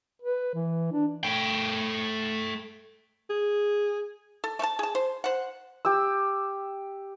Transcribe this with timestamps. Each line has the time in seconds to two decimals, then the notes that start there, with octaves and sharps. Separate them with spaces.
0.22 B4
0.55 E3
0.92 D4
1.23 A3 G5
3.29 G#4
4.44 A4
4.59 A3 A5
4.79 G#4 A5
4.95 C5
5.24 C5 F#5
5.85 G4 E6